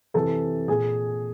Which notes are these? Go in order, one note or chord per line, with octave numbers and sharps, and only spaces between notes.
C3 E3 A4 A5
A#2 G#4 G#5